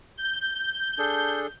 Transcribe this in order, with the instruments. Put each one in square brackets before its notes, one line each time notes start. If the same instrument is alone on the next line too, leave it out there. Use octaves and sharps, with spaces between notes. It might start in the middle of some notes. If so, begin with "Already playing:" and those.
[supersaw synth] G6
[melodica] D4 G#4 A4